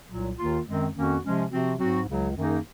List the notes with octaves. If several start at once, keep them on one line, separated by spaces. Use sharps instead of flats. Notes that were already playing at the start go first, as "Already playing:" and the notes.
C2 A#2 F#3
D#2 D#3 A#3 F4
F#2 D#3 G#3 C4
F2 D#3 A#3 C#4 F#4
C3 F3 G#3 C#4
C3 F3 C4 F#4
G#2 F#3 C4 F#4
C#2 C#3 F#3
F#2 D#3 A#3 D#4 G#4